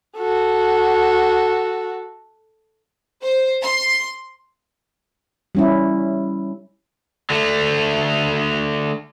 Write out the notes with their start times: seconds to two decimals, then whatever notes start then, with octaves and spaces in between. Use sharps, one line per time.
0.18 F#4 A4
3.22 C5
3.63 C6
5.55 G3 C#4 E4
7.30 D3 A3